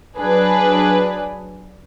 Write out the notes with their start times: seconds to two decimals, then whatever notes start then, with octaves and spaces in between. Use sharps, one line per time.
0.17 F#3 D4 G#4 B4